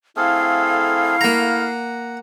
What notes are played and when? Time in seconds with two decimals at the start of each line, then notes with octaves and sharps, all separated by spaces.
0.17 A3 C4 E4 G#4 A4 F5 F6
1.21 A#3 F#5 A#5